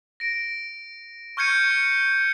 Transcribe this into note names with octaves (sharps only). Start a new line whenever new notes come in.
A#6 D7
C#6 F6 G6 G#6 C#7 D#7